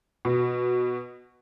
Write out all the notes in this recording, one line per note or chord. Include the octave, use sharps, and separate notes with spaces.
B2